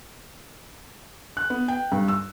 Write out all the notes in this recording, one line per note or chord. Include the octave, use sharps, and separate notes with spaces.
F#6
B3
G5
G2
E6